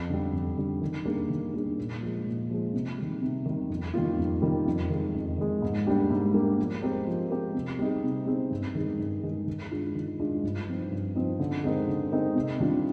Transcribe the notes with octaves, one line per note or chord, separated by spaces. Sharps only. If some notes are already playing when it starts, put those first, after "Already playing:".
Already playing: F2
D3 G3
F2
D3 G3
D#3
G3 A#3 D4 G#4
D#3
G3 A#3 D4 G#4
A#2
F3 G#3
A#2
F3 G#3
C3
D#3 G3
C3
D#3 G3
F2
D#3 G3 A#3 F4
F2
D#3 G3 A#3 F4
F2
D#3 G#3
F2
D#3 G#3
G#2
G3 A#3 D4 G4
G#2
G3 A#3 D4 G4
F3
G#3 C4 G4 A#4
F3
G#3 C4 G4 A#4
C3
G3 C4 D#4 G#4
C3
G3 C4 D#4 G#4
G2
D#3 G#3 D#4 G#4
G2
D#3 G#3 D#4 G#4
D#3
G#3 D4 F4
D#3
G#3 D4 F4
G2
F3 C4 D#4
G2
F3 C4 D#4
D3
G#3 C4 D#4 A#4
D3
G#3 C4 D#4 A#4
C3
D#3 G3 D4 F4